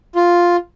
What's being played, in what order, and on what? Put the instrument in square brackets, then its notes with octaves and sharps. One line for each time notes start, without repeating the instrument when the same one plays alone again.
[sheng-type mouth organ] F4